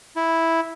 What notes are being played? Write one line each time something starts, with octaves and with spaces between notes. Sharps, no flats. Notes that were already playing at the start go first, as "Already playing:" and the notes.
E4